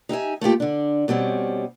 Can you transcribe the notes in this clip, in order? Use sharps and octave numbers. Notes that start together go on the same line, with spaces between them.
D#4 G4 E5 G#5
A3 A#3 F4 G4
D3 D4
B2 G3 C4 C#4